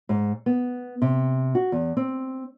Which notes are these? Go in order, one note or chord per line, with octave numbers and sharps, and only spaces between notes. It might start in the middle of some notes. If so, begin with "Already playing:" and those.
G#2
B3
C3
F#4
E2
C4